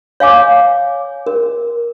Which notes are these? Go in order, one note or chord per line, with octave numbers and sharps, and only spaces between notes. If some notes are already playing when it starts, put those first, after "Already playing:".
C#5 F5 G#5 D6
A#4